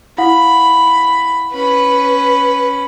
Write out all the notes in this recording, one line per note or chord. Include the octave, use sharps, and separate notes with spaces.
E4 F5 F#5 B5
C#4 B4 B5